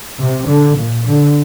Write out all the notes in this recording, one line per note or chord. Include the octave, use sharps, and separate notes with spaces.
C3
D3
A#2
D3